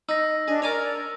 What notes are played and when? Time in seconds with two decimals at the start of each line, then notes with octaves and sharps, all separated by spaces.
0.09 D#4 E6 A#6
0.48 D4 G#4 D#5
0.62 A#4 C#5 D5 G#5 D6